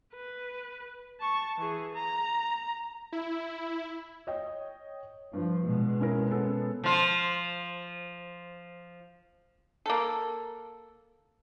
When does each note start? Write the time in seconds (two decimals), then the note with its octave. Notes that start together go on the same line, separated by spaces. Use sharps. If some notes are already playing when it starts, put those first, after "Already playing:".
0.15 B4
1.20 A5 C#6
1.58 E3 G#4
1.95 A#5
3.12 E4
4.27 C#5 D#5 G5
5.33 G2 F3
5.63 B2 G#3
6.00 C#4 E4 A#4
6.31 B3 C#4 A4
6.84 F3 F4
9.86 A#3 A4